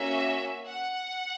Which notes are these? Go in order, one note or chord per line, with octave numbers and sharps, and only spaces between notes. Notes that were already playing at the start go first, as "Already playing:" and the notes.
Already playing: A#3 C#4 F#4 E5
F#5